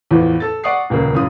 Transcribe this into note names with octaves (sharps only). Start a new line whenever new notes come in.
E2 A2 E3 F3 B3
A4 A6
D5 F#5 C#6 D#6 C7
D#1 C#2 C#3 A#3
F#2 A2 F4 D#6